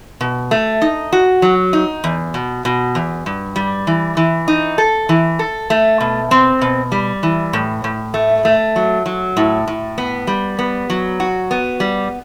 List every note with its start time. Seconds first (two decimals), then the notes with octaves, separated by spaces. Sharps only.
0.21 B2
0.51 A3
0.82 D#4
1.13 F#4
1.42 F#3
1.73 D#4
2.04 E2
2.34 B2
2.65 B2
2.95 E2
3.26 G2
3.56 G3
3.87 E3
4.17 E3
4.48 D#4
4.78 A4
5.09 E3
5.39 A4
5.70 A3
6.01 B2
6.31 C4
6.62 B2
6.92 G3
7.23 E3
7.53 A2
7.84 A2
8.14 A3
8.45 A3
8.76 F#3
9.06 F#3
9.37 A2
9.68 A2
9.98 B3
10.27 G3
10.59 B3
10.90 F#3
11.20 F#4
11.51 B3
11.80 G3